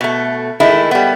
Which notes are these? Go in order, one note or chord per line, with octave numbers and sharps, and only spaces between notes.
B2 A3
D#3 G#3 A3 E4
G3 B3